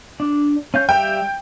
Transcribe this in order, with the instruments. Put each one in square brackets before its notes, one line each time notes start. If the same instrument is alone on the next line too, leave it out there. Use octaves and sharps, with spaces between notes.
[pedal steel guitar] D4
C#4 F5 G6
[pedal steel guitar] G3 E5 F5 [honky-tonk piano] G5